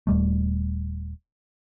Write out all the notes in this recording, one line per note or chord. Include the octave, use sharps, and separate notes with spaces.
D#1 G3 A3